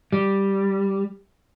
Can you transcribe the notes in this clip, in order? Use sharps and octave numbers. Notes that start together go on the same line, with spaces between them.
G3